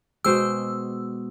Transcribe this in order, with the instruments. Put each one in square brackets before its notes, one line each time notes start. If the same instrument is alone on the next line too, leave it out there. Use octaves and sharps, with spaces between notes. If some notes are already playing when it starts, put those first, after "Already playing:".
[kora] B2 C5 G5 [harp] G#3 [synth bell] E6